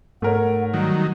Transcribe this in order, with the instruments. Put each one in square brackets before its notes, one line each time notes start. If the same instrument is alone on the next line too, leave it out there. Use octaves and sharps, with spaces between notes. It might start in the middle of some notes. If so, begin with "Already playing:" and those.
[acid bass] G#2 [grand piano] A3 A#4 C#5 [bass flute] F#5
[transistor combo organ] D#3 F#3 [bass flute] G3